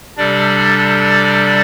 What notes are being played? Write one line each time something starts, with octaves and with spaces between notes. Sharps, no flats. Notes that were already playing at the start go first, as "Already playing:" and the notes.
C3 G3 D4 A4 D5